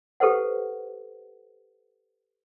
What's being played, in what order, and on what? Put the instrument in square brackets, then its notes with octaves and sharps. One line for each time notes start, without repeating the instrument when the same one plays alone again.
[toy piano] G4 A4 B4 C5 F#5